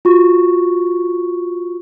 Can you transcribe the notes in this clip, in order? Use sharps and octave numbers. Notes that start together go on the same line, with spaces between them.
F4 F#4 C#6